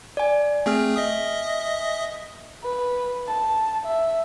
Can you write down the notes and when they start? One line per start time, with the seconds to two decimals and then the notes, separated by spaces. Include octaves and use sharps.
0.17 D5 G#5
0.66 A3 C4 G#4 G#5 F6
0.96 D#5 E5 D#6
2.64 B4
3.27 A5
3.85 E5